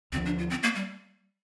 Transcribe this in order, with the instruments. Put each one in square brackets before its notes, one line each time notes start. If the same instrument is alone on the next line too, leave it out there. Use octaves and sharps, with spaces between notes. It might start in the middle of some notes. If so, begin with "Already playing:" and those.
[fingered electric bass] D2 [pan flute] C4
[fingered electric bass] D3 F3
[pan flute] D4
F4
C4
A#3
G3